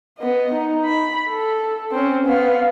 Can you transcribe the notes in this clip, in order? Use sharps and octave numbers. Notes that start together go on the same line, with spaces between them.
B3 D#5
D#4
B5
A4
C4 C#4
B3 F5